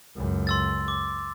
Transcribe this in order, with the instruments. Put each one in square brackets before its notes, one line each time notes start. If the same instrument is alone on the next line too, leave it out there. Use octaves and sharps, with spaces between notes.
[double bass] C#2 F#2
[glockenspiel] C6 E6 A6
D6